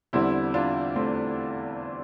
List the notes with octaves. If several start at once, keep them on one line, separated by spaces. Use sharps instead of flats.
E2 D3 G3 C4 E4
D4 F4
A3 C4